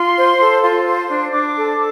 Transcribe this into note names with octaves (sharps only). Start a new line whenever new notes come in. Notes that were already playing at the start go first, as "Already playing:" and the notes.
Already playing: F4 C6
C5
A4
F4
C5
D4
D4 D6
A4